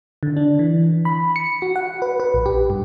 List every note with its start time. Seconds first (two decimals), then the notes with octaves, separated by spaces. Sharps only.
0.23 D3
0.37 D4
0.59 E3
1.05 B5
1.36 C#7
1.62 F#4
1.76 F#5
2.02 B4
2.20 B4
2.34 A#1
2.46 G4
2.70 G2